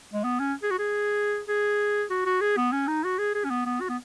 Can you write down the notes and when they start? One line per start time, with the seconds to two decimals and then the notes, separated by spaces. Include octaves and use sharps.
0.13 G#3
0.24 B3
0.40 C#4
0.63 G#4
0.71 F#4
0.79 G#4
1.48 G#4
2.10 F#4
2.26 F#4
2.41 G#4
2.57 B3
2.72 C#4
2.88 D#4
3.04 F#4
3.19 G#4
3.35 G#4
3.45 C#4
3.50 B3
3.66 B3
3.81 F#4
3.89 B3